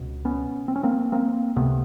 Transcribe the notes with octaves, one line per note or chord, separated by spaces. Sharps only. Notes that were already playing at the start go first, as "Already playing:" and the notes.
Already playing: C#2 B2
B3 C#4
C4
C#4
A#3 C4
A#3 C4
C#2 C3 A3 B3